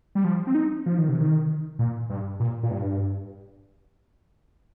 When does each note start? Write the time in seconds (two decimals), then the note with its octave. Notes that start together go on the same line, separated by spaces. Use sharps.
0.15 G3
0.24 F3
0.47 C4
0.55 D#4
0.86 F3
0.98 D#3
1.09 C3
1.20 D#3
1.79 A#2
2.10 G2
2.40 A#2
2.63 A#2
2.71 G2